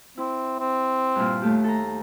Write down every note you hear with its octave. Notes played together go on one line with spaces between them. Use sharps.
C4 E4
C4
G2 A#2
D#2 A3 G4
A4 A#5